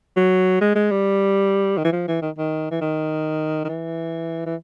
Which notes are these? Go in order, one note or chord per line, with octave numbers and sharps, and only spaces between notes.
F#3
G#3
G#3
G3
D#3
E3
F3
E3
D#3
D#3
E3
D#3
D#3
E3
E3